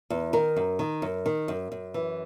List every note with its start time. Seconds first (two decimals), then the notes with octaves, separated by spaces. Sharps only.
0.10 E2
0.33 D#3 A#4
0.56 F#2
0.79 D#3
1.02 F#2
1.26 D#3
1.48 F#2
1.72 F#2
1.94 E3